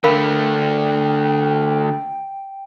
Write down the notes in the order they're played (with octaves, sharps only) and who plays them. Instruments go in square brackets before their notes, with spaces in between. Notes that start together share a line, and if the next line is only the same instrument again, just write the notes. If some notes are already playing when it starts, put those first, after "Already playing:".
[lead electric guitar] D3 A3 [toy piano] A#4 F5 B5 [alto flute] G5